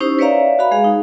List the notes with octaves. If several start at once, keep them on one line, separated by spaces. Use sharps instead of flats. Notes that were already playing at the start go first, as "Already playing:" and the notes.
C#4 D#4 E4 G4 C5
B4 C#5 D5 E5 F5 A#5
F#4 F5 B5
G#3 G#4 F5
D#4